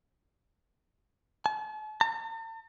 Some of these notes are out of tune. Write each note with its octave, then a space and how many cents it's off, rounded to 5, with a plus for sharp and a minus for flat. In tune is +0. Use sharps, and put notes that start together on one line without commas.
A5 -40
A5 +45